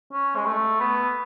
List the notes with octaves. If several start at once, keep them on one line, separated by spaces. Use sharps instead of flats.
C#4
G#3
A3
B3